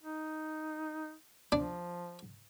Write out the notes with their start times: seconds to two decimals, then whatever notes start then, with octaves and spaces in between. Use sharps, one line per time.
0.03 D#4
1.52 F3 D4